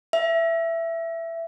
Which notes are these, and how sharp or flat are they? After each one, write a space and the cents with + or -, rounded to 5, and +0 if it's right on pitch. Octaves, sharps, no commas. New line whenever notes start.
E5 +10